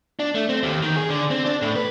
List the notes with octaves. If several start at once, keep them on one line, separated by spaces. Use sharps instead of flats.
D4
A3
C4
D#2
D#3
G#4
D3
C4
D4
A2
B4